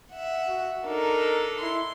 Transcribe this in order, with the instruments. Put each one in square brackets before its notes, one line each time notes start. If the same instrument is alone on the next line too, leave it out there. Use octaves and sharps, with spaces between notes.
[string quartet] E5 F#5
[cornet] F#4
[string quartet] D4 D#4 A4 [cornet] A#4
[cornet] E4 [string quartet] C6